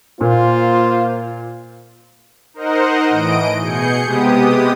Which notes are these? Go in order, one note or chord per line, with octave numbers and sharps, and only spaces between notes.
A#2 A#3 F4 C5
D#4 A#4 C5 D#5 F#5
A2 E3 D#5 D7
B2 G#4 G6 C#7
C3 G#3 B3 G4 D#6